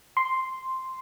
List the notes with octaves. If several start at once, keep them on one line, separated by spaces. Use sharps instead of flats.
C6